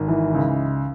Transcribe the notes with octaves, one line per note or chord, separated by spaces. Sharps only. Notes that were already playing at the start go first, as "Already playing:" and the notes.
Already playing: G#1
E3
C#2